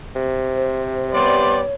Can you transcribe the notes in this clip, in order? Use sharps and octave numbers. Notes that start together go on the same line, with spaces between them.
C3
C5
G3 B3 C#5 D5 C6